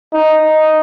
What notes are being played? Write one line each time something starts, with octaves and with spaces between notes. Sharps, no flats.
D#4